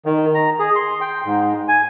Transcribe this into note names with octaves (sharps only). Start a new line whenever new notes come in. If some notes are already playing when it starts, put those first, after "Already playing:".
D#3
A#5
G#4
C6
G5
G#2
G#5